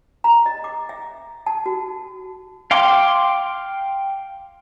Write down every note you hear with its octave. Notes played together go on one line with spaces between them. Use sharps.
A#5
D#5
D6
E5
A5
F#4
F5 G5 C6 D6